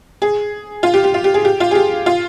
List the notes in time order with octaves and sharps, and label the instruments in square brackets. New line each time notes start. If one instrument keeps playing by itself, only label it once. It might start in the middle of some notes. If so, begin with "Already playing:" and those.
[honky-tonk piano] G#4
F4
G4
G4
F4
G4
G#4
G4
F4
G#4
G4
F4